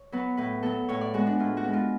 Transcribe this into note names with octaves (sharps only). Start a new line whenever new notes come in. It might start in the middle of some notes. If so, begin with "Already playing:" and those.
Already playing: C#5
F#3 B3 B4
A2 B4
F#3 B3 A4
A2 C#5
D5
G#3 B3 F#4
D4
A2 F4
F#4
G#3 B3
F4